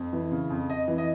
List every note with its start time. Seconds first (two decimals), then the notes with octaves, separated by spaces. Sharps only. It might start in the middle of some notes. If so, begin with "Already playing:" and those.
Already playing: F2
0.13 E3
0.32 C#3
0.50 F2
0.69 F2 D#5
0.88 E3
0.98 D#5